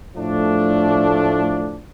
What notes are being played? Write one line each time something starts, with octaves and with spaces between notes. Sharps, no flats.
A2 F3 A3 D4